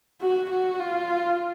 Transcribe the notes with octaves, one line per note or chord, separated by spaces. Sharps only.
F#4
F#4
F4